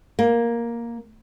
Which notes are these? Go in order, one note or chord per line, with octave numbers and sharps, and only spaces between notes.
A#3